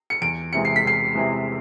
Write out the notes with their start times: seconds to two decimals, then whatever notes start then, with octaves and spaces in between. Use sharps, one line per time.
0.10 C#7
0.22 E2 D7
0.53 C3 E3 G#3 C#7
0.65 C7
0.76 B6
0.85 E2 C7
1.15 C3 E3 G#3